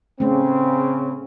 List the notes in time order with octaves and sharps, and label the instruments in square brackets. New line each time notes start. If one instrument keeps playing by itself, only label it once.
[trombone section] C#3 C4 [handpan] A3 C#4